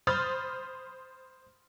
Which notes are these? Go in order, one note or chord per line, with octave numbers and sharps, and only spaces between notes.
C5 B5 D#6 F6 G6 A6